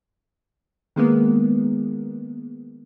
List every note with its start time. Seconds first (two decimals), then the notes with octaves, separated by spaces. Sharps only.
0.96 D#3 G#3 A#3 B3